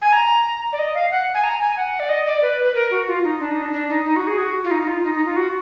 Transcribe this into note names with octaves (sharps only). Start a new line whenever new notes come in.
G#5
A#5
D5
D#5
F5
F#5
G#5
A#5
G#5
F#5
D5
D#5
D5
B4
B4
A#4
F#4
F4
D#4
D4
D#4
D4
D4
D#4
D#4
F#4
G#4
F#4
F4
D#4
D#4
F4
D#4
D#4
F4
F#4